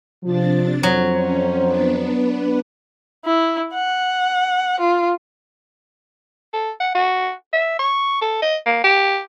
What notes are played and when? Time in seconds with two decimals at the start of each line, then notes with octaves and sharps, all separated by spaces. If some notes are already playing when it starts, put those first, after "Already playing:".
0.24 C3 F3 D4 A6
0.83 F2 F#3 C5
1.14 C#4
1.63 B3 D4 B4
3.25 E4
3.74 F#5
4.80 F4
6.53 A4
6.80 F#5
6.95 F#4
7.53 E5
7.79 C#6
8.22 A4
8.42 D#5
8.66 A#3
8.84 G4